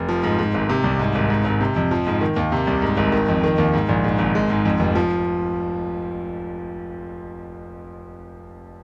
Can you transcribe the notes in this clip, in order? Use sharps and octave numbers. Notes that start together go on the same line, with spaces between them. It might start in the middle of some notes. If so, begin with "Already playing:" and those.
Already playing: F1
F3
G#2
G#2
G#1
C3
C2
G#2
G#1
G#2
G#1
C3
F2
F3
G#2
D#3
D#2
C3
C2
G#2
G#1
D#3
F2
D#3
D#2
G#2
A#1
G#2
G#1
G#3
G#2
F2
F1
F3